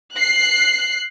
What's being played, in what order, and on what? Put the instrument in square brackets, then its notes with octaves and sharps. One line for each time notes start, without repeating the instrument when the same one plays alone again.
[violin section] F#6 C7